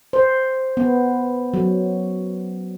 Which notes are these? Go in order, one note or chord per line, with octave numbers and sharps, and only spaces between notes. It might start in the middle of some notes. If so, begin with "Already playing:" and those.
C5
B3
F#3